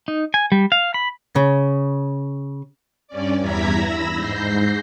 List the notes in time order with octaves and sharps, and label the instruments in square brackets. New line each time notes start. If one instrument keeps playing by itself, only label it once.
[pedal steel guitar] D#4
G#5
G3
F5
B5
[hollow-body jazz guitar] C#3
[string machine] G2 C#4 D5
E2 G2 E4 A#5 G#6 B6
B5 E6 A#6
G#2 G6 A#6 C7